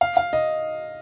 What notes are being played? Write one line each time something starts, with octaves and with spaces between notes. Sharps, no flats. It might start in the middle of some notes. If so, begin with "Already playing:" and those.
F5
F5
D#5